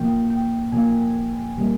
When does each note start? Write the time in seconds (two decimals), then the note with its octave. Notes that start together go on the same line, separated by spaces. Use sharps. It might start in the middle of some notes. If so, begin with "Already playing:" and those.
Already playing: A#2 F3 A#3 G5
0.30 G5
0.72 A#2 F3 A#3 G#5
1.57 A#2 G3 A#3